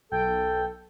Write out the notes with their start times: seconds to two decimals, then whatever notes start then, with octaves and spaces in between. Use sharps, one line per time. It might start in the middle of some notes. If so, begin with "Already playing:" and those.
0.12 B1 A4 G5